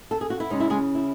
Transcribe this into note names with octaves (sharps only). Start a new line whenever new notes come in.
A4
G#4
F#4
E4
C#3 G#3 C#4 D#4
E4
G#3 G#4
E4